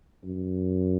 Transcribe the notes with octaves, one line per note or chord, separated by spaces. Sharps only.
F#2